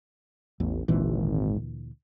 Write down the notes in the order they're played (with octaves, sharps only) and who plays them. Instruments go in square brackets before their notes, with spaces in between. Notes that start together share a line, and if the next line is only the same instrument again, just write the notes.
[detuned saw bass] A1 [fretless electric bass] E2
[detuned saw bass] G#1 [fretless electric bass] D2 A#2 E3